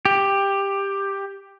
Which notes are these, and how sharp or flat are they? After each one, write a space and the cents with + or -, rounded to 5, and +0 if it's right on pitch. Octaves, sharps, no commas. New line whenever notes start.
G4 +10